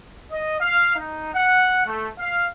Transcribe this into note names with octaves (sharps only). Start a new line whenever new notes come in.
D#5
F5
D#4
F#5
A3
F5